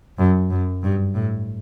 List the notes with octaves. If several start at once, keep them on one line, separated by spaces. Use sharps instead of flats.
F#2
F#2
G2
A2